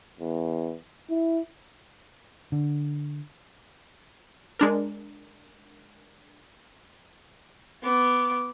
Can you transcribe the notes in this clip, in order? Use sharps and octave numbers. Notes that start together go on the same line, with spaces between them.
E2
E4
D3
G#3 D4 A#4
B3 D6